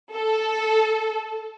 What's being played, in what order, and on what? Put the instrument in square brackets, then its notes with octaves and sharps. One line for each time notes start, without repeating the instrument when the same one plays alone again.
[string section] A4